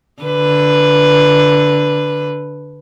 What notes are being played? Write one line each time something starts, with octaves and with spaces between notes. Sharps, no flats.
D3 B4